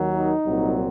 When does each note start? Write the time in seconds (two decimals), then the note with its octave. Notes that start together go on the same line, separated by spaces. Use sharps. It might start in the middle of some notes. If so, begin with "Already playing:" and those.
Already playing: D#2 D#3 F#3
0.15 D#4
0.44 C2 A#2 F#3 C4